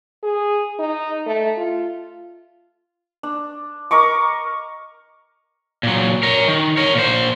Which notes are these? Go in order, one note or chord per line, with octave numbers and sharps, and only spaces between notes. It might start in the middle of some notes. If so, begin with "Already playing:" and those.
G#4
D#4
A3
F4
D4
A#4 D#5 C#6 D6
A#2 F#3
A#4 C#5
D#3
A#4 C#5
A#2 C5